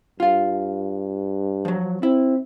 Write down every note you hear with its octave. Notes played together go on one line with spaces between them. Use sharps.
G2 F4 F5
F3 F#3
C4 E4